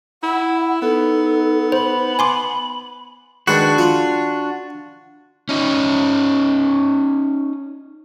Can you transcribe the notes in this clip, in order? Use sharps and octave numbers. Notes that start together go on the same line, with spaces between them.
E4 F#5
B3 D#4 A4
C5 B5
G#5 C6 D6
D#3 G#3 D4 F#4 B4
F4
C#4 D#4